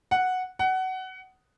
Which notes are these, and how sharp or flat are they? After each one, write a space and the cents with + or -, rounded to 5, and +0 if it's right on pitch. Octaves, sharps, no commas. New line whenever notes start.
F#5 -5
F#5 +20